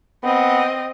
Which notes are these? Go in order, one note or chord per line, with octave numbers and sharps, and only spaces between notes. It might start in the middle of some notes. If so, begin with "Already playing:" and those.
B3 C4 D#5